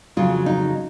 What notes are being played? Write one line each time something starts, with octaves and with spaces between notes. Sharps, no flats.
F2 C#3 F#3 F4
D#4